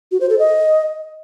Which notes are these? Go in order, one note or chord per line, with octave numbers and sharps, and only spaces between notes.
F#4
C5
A4
D#5